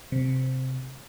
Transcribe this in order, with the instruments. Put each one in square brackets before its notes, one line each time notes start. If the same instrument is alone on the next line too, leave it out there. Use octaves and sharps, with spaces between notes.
[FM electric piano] C3